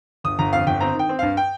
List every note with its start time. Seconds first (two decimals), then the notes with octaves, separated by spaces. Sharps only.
0.24 G1 D#6
0.39 G1 A#5
0.53 F2 F5
0.67 G1 G5
0.80 C4 A#5
0.94 D#3
0.99 G5
1.09 C4
1.19 G2 F5
1.37 G5